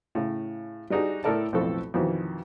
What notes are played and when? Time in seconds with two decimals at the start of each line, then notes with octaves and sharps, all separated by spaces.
0.15 A2 C#3
0.90 G3 D4 D#4 F#4 G#4
1.24 A2 E4 A4 A#4 D5 A5
1.52 B1 F2 A2 C4 A4 C#6
1.94 F2 B2 D#3 E3